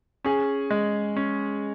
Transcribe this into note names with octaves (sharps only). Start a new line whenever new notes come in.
C#4 G#4
G#3
C#4